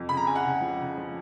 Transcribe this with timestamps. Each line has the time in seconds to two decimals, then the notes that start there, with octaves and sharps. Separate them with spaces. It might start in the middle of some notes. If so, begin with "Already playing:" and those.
Already playing: F2
0.09 C#3 B5
0.17 A#5
0.27 C#3 G#5
0.36 F#5
0.44 C#3
0.61 F3
0.79 C#3
0.97 F3